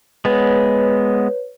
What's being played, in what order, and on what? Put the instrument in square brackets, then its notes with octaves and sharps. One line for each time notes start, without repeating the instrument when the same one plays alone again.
[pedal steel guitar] G#3 B3 [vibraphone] B4 C#5